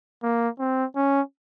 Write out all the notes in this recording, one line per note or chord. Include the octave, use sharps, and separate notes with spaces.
A#3
C4
C#4